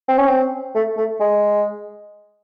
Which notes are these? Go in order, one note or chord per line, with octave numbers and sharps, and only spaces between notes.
C4
C#4
C4
A3
A3
G#3